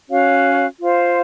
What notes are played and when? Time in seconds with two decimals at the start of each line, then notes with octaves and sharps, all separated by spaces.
0.09 C#4 F#4 C#5 F5
0.80 F4 C5 F5